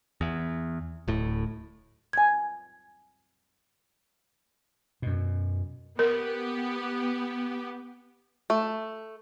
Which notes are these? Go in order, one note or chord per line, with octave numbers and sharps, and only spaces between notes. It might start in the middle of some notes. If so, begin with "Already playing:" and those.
E2
D1 A2
G#5 G#6
F#2 B2
B3 G4 A#4
A3